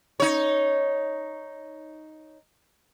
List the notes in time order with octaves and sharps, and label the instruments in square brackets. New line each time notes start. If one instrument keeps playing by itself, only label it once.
[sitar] D#4 C#5